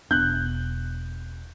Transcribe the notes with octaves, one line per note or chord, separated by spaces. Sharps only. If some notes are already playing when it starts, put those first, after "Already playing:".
E1 B3 D4 F#6 G6